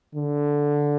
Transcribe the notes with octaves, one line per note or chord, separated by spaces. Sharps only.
D3